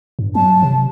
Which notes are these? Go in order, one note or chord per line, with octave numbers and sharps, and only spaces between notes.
G2
F#3 A5
C3